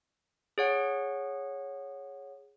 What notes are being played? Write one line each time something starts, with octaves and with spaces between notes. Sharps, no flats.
G#4 C#5 F#5